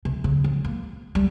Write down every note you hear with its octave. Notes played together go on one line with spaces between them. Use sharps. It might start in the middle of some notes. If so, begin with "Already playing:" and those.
C3
C#3
F3
A#3
G3